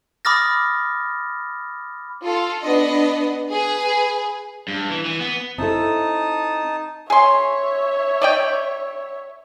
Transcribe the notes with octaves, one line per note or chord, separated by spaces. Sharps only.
B5 D6 D#6 F6 A6 A#6
F4 A4
B3 D4 D#5
G#4 B4 G#5
G2
E3
E3
B3
C4 D#4 E4 A4 A5 D#6
G#4 C#5 E5 C6
D5 D#5 G5